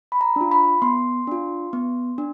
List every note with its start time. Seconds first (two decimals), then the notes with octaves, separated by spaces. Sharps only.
0.12 B5
0.21 A#5
0.36 D4 F4
0.52 B5
0.82 B3 C6
1.27 D4 F4
1.73 B3
2.18 D4